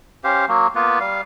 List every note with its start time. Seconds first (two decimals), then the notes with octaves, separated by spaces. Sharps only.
0.24 C#4 G4 C5 F5
0.48 F#3 A#3
0.75 A#3 B3 F4 B4
1.00 G3 F5